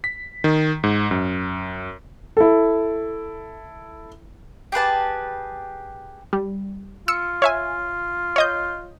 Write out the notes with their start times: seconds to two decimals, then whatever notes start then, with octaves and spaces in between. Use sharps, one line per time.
0.04 B6
0.44 D#3
0.84 G#2
1.11 F#2
2.37 E4 A4
4.72 G4 G#4 B4 A5
6.33 G3
7.08 F4 E6 C#7
7.42 C#5 E5 G#5
8.36 C#5 D#5 G6